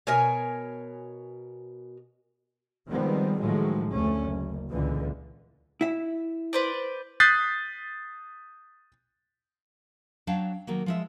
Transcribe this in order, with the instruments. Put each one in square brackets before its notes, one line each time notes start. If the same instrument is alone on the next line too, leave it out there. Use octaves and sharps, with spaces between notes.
[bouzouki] B2 A#4 C#5 G#5
[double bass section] D#3 F3 G3 G#3 B3 C4
A2 D#3 F3 F#3 G#3 A3
F1 D2 A3 C#4
F#1
C#2 A#2 D3 E3
[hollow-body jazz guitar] E4 E5
[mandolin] B4 C5 D5
[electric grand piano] D#6 F#6 G6 A6 B6 C7
[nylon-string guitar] F#3 D4 C#5 F5 G5 A5
D#3 F#3 A#3
F3 G#3 E5